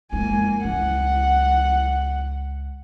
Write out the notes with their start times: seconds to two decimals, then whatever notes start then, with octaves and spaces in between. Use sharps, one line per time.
0.12 F2 G#3 A#3 G#5
0.64 C#2 F#5